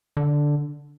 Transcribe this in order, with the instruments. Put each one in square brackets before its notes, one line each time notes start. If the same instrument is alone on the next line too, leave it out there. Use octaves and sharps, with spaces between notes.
[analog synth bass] D3